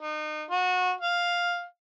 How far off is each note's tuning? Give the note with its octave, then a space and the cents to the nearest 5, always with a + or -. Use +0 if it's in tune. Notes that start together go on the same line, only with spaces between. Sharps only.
D#4 -35
F#4 -25
F5 +5